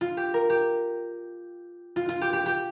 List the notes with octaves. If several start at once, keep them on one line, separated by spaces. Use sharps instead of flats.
F4
G4
A#4
G4
F4
F4
G4
G4
G4